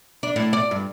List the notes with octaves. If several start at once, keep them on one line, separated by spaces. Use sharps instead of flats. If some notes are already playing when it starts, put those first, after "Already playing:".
D4
A2
D5
G2